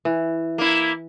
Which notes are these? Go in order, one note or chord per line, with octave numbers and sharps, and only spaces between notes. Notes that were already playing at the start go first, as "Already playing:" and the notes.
E3
A#3 E4